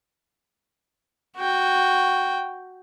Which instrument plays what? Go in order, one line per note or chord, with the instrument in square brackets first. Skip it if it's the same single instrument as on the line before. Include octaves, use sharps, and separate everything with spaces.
[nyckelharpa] F#4 G5